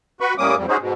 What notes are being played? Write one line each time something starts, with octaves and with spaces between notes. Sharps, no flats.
F#4 B4 B5 C#6
A2 G3 A#3 C#4 D6 D#6
F2 G#2 G3
C#4 D#4 F#4 G#4 C5
G#2 B2